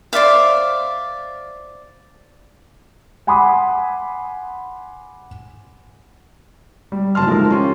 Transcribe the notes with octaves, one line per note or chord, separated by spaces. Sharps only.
C5 D5 E5 F5
F#5 G#5 B5 C6 D6 D#6
G3
F#1 F#3 A5 C6 F6
F3 G#3 A3 D#4 A#4
C#4 F4 G4